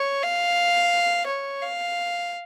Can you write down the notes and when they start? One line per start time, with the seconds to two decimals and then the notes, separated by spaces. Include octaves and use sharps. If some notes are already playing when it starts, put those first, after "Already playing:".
Already playing: C#5
0.23 F5
1.27 C#5
1.61 F5